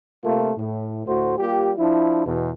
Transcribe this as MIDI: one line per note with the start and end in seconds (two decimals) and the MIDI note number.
0.23 0.51 48
0.23 0.51 57
0.23 0.51 58
0.23 0.51 65
0.57 1.04 45
1.06 1.35 38
1.06 1.35 45
1.06 1.35 57
1.06 1.35 66
1.06 1.35 72
1.38 1.72 55
1.38 1.72 58
1.38 1.72 65
1.38 1.72 67
1.78 2.23 53
1.78 2.23 62
1.78 2.23 64
2.25 2.50 40
2.25 2.50 47